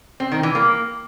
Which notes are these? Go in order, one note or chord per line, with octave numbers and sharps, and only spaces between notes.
C4
D#3
E3
A#3